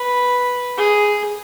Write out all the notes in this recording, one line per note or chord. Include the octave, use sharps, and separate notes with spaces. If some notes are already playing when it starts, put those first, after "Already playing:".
Already playing: B4
G#4